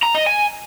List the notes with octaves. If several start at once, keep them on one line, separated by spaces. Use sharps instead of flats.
A#5
D#5
G#5